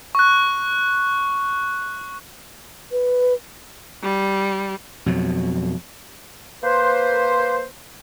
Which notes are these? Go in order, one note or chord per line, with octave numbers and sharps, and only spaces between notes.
C#6 F#6
B4
G3
F2 B2 F#3
A#3 B4 C5